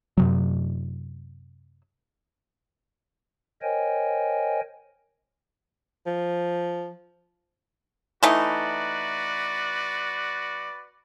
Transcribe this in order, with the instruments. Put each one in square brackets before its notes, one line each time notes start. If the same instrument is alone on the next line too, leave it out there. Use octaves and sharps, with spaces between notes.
[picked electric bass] F#2 C3 F#3
[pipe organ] A#4 C5 C#5 D#5 G5 G#5
[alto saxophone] F3
[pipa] E3 A3 D#4 [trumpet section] F#4 B4 D5